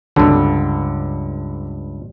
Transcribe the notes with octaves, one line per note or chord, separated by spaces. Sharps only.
C#2 G2 D3